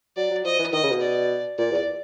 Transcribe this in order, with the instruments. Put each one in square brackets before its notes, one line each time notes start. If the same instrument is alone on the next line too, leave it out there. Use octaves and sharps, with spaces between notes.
[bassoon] F#3 [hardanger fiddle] D5
[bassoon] F#3
[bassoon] F3 [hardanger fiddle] D#5
[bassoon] E3
[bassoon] D#3 [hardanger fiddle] D#5
[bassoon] C#3
B2
[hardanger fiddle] D5
[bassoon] A#2 [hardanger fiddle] D5
[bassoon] E2